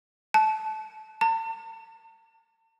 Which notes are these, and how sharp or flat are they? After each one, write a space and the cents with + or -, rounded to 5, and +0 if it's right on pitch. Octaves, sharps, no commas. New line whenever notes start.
A5 -20
A5 +45